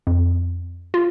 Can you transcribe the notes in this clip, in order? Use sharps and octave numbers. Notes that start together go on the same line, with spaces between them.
F2
F4